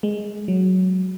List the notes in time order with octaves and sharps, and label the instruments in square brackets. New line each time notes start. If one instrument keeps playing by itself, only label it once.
[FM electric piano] G#3
F#3